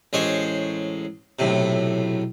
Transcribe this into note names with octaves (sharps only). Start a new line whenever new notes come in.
A1 G#3 C5 C#5
B1 A2 C3